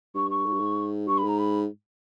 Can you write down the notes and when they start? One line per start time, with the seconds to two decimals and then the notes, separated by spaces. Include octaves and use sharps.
0.14 G2 C#6
0.30 C#6
0.46 G#2
0.53 G2
0.60 G#2
1.08 G2 C#6
1.18 B5
1.24 G#2 A#5
1.38 B5